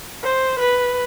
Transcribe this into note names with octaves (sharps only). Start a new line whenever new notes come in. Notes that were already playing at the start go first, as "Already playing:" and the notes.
C5
B4